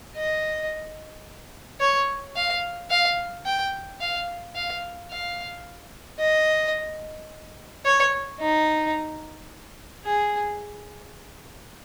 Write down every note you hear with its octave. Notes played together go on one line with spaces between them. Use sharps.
D#5
C#5
F5
F5
G5
F5
F5
F5
D#5
C#5
D#4
G#4